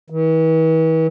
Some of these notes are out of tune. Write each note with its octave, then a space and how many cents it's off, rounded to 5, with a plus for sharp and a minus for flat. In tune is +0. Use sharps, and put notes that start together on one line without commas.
E3 -40